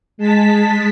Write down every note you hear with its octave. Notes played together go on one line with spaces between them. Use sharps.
G#3 A5 B6